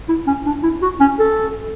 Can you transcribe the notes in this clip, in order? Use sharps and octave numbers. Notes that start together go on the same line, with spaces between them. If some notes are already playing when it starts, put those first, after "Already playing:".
E4
C#4
D4
E4
F#4
C#4
A4